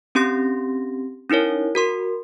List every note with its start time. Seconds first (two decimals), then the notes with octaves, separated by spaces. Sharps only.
0.15 C4 C#4 G4 C6 A#6
1.30 C#4 D#4 E4 A#4 C#5
1.75 F#4 A#4 C6